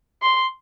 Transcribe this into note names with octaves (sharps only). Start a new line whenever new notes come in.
C6